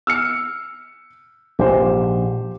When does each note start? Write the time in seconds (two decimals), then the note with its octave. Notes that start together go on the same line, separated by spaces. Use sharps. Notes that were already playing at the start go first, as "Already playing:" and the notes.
0.07 E6 F6 C#7
1.59 A#1 G#2 G4 C5